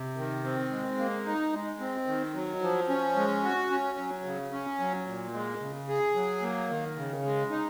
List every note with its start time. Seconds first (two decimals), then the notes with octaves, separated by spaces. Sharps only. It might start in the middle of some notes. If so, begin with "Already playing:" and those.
Already playing: C3
0.17 D#3
0.44 C4
0.71 G#3
0.98 A#3
1.25 D#4
1.53 G#3
1.80 C4
2.07 D#3
2.34 F#3
2.62 F3
2.89 C#4
3.16 G#3
3.43 F#4
3.70 C#4
3.98 F#3
4.24 C#3
4.51 C#4
4.79 F#3
5.06 A#2
5.33 G#3
5.60 C#3
5.88 G#4
6.15 F#3
6.42 A#3
6.70 D#3
6.97 C#3
7.24 G#3
7.51 D#4